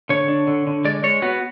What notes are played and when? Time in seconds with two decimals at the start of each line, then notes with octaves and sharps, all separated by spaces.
0.09 D3 C#5
0.28 D4
0.47 D3
0.67 D3
0.85 G#3 D5
1.03 G#3 C#5
1.22 B3 F#4